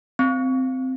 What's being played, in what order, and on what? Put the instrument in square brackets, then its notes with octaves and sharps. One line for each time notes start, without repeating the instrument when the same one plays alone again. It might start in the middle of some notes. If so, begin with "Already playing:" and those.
[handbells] C4